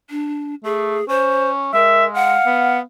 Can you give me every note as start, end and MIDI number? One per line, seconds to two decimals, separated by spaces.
0.10 0.55 62
0.64 0.98 57
0.64 1.07 68
1.09 1.70 61
1.09 1.50 72
1.74 2.35 56
1.74 2.08 70
1.74 2.05 76
2.14 2.81 77
2.14 2.78 78
2.46 2.81 59